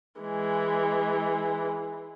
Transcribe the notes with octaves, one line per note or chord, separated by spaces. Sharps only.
E3 G#3